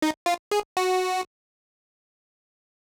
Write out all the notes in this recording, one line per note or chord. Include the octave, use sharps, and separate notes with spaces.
D#4
F4
G#4
F#4